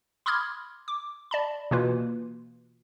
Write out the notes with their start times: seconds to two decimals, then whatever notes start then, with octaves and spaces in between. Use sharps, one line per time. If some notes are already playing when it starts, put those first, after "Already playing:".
0.26 B5 C6 D6 D#6 F6 G#6
0.88 D6
1.31 D5 A5 B5
1.71 B2 E3 A#3 F4 B4